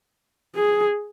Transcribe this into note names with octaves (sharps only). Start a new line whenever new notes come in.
G#4